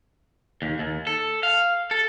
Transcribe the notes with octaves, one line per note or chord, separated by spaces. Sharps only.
D#2
D#2
A4
F5
A4